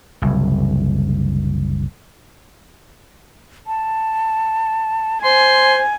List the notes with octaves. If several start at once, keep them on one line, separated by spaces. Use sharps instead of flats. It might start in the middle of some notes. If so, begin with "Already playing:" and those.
F#1 C2
A5
C5 G#5 C6